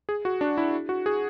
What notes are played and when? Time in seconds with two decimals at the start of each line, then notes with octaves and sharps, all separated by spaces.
0.09 G#4
0.25 F#4
0.41 D4
0.58 E4
0.89 F#4
1.06 G#4